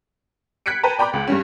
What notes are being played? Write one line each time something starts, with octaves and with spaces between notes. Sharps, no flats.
F#6 G#6 B6 C#7 D7
B4 G5 A5 A#5
D5 G5 A#5 B5 D6
C#2
G2 G3 C#4